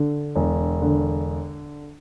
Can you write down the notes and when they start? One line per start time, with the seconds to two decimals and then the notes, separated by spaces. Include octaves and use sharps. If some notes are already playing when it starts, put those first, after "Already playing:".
Already playing: D3
0.36 E1
0.82 D3